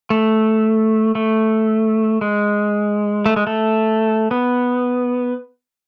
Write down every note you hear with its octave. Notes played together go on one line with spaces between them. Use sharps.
A3
A3
G#3
A3
G#3
A3
B3